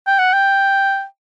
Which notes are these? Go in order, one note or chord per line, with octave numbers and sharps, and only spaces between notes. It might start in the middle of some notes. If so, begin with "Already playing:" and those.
G5
F#5
G5